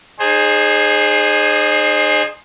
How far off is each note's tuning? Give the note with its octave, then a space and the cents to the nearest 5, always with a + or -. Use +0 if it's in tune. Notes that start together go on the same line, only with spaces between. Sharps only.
D#4 -40 G#4 +0 C5 +20